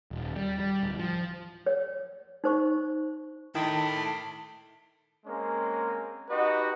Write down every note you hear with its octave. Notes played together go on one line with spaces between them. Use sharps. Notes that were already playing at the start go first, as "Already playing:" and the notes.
D#1
G3
G3
D1
F3
C#5
D#4 C5 C#6
D#3 E4 A4 A5 B5 C6 D6
G#3 A#3 C4 C#4 A#4 G#5
D#4 F#4 G4 B4 D#5